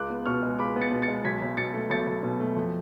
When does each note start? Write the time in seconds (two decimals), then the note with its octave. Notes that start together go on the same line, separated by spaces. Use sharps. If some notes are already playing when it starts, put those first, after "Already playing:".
Already playing: C#2 D6 F#6
0.10 B3
0.26 B2 C#6 F6
0.43 G#3
0.59 C#2 B5 D6
0.76 B3
0.81 A6 C#7
0.91 B2
1.02 A6 C#7
1.08 G#3
1.24 B1 G#6 B6
1.41 B1
1.57 B2 A6 C#7
1.74 A3
1.90 B1 A6 C#7
2.07 B1
2.23 B2
2.40 A3
2.56 F2